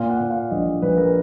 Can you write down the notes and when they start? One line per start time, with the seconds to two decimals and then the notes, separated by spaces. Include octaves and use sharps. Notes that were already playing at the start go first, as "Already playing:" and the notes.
Already playing: A#2 F5
0.10 F#5
0.20 A#2
0.30 F5
0.51 A#1 D#5
0.82 A#1 B4
0.98 A#4